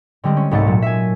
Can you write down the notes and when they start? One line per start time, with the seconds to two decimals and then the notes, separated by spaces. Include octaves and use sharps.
0.24 D3 G3 G#3 C4
0.37 C#4
0.51 C2 G#2 A3 A6 C#7
0.67 A#2 F#3
0.82 E5 G#5